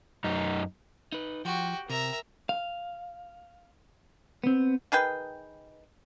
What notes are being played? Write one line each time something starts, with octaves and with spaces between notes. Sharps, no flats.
F#2 D#4
D#4 B4
F3 F#4 G4 G5
C3 A#4 E5 A#5
F5
B3 C4
D#3 G#4 B4 G5